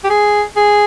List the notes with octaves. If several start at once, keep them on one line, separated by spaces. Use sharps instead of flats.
G4
G#4
G#4